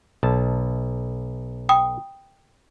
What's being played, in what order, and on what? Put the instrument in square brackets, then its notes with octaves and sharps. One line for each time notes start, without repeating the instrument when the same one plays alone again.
[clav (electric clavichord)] B1 A5
[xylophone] G5 B5 D#6